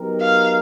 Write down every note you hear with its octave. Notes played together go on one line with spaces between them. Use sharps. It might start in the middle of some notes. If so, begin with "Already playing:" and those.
Already playing: F#3 B3 D#4 G4 A#4
F5